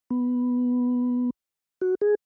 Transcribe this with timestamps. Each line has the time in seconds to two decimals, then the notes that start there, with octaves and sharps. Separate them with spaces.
0.10 B3
1.81 F#4
2.01 G#4